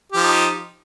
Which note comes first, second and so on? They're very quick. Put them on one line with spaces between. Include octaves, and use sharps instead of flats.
G4 F3 D#4